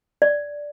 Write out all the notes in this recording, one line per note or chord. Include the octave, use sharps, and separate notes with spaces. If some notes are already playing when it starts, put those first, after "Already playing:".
D5